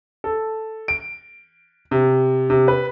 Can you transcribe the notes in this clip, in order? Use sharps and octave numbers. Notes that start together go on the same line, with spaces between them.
A4
D7
C3
C3
B4